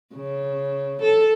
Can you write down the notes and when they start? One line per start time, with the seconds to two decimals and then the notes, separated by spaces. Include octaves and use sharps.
0.14 C#3
1.01 A4